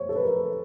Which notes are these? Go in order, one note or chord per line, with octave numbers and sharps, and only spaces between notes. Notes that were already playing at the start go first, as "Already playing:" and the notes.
Already playing: C5 C#5
A4
B4
A#4